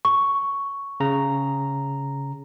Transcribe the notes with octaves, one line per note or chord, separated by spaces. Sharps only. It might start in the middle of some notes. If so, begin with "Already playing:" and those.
C#6
C#3 A#5